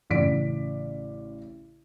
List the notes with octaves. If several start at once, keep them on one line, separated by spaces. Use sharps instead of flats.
A1 C#3 D5 B6 D7